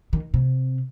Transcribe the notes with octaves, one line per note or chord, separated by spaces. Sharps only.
D#3
C3